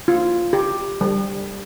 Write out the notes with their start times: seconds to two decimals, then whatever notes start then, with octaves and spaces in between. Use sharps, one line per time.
0.08 F4
0.53 G4
1.01 G3